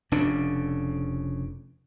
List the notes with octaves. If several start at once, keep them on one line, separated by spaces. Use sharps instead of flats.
F1 C#3 D4